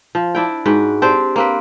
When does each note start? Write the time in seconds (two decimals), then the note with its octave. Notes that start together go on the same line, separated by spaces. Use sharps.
0.15 F3
0.35 D4 E4 G5
0.66 G#2 F#4 B4 G5
1.02 C4 D4 G4 C5
1.36 A#3 C4 B4